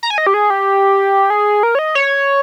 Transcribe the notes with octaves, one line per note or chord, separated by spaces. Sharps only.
A#5
G#5
D#5
G4
G#4
G4
G#4
A#4
C#5
D#5
C#5